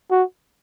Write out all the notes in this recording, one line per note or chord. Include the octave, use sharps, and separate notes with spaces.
F#4